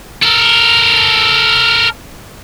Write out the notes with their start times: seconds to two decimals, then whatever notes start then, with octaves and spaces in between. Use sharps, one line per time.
0.23 A4 A#4